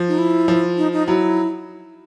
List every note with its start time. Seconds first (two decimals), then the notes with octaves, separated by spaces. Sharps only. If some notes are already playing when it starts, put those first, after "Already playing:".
Already playing: F3
0.08 D#4
0.18 E4
0.48 F3
0.77 D#4
0.93 D#4
1.07 F#3 E4